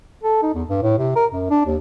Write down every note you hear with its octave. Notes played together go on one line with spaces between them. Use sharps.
A4
D#4
E2
G2
A2
C3
A#4
F#2
D4
D#2